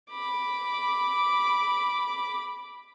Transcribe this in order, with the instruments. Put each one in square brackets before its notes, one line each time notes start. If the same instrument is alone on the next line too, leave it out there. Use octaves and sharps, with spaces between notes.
[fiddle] B5 D6